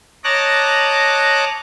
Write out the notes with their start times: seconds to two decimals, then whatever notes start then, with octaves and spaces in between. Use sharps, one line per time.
0.24 C#5 D#5 A5 A#5 D6 F#6